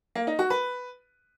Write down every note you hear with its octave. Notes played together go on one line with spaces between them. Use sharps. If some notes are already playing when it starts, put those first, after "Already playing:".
A#3
D#4
F#4
B4